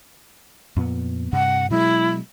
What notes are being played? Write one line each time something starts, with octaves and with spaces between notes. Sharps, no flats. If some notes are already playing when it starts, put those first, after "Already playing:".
F2 A#2 B3
G2 C3 F#5
B2 F#3 G#3 E4